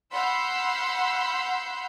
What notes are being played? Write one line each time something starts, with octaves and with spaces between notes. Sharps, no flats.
F5 F#5 B5 C6 E6 G6